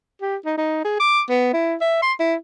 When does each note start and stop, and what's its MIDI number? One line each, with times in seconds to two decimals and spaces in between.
0.22 0.36 67
0.45 0.55 63
0.58 0.80 63
0.84 0.98 68
1.00 1.21 86
1.30 1.52 59
1.53 1.75 64
1.81 2.01 76
2.02 2.13 84
2.20 2.35 64